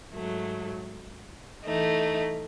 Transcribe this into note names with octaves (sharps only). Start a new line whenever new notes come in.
G#2 F#3 A3
E3 A3 D#4